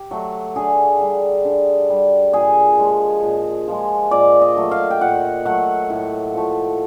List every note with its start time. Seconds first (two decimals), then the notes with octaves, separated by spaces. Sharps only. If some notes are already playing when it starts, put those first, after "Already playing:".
Already playing: G4
0.11 F#3 A3
0.56 D3 G#4
1.01 G3
1.45 D3
1.90 G3
2.33 A#2 G#4
2.79 F3 G#3
3.23 A#2
3.68 F3 G#3
4.11 A#2 D5
4.41 D#5
4.57 F#3 A3
4.71 F5
4.90 G5
5.01 A#2 F#5
5.45 F#3 A3 F#5
5.90 A2
6.34 F3 A3